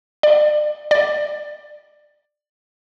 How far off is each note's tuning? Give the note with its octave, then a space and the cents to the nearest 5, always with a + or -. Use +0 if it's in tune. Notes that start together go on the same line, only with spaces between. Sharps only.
D5 +35
D5 +20